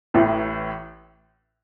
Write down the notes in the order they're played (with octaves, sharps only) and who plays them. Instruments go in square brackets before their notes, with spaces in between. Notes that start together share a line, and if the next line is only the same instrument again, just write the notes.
[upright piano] A1 A2 E3